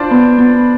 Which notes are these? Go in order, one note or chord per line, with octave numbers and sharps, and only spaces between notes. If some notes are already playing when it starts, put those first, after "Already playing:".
Already playing: D4 F4 C5 D5
B3
B3